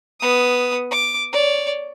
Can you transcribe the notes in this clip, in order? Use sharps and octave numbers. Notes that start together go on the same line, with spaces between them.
B3 D#6
D6
C#5 D5